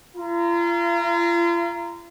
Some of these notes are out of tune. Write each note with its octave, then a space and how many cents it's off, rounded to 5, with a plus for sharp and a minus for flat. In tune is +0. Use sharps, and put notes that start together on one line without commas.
F4 -40 A#5 +0